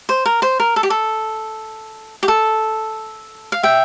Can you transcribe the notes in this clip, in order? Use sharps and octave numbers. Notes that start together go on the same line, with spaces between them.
C5
A#4
C5
A#4
A4
G4
A4
G4
A4
F5
E5 G5